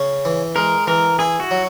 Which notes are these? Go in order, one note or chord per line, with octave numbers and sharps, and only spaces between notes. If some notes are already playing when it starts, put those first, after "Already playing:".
Already playing: C#3 C#4
E3
G#3 A#4
E3 A#4
E4 G#4
F#4
F#3